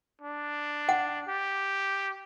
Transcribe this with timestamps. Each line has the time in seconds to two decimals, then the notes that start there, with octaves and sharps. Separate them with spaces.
0.21 D4
0.89 F#5
1.28 G4